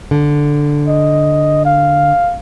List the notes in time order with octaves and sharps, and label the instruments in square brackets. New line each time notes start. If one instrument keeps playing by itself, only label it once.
[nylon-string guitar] D3
[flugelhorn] D#5
F5